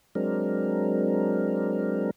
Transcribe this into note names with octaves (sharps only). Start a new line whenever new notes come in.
F#3 G#3 C4 D4 A#4